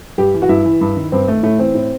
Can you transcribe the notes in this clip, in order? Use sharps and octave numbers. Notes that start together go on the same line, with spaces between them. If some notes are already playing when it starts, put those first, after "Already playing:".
G2 G4
E3
F#4
G2 E4
E3
G2
D#3
G2 C4
D#3 A3
A2 A3
E3 C4
A2